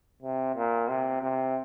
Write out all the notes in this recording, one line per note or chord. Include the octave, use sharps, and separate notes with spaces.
C3
A#2
C3
C3